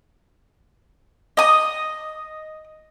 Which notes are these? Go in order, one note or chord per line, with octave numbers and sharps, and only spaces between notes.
D#5 D#6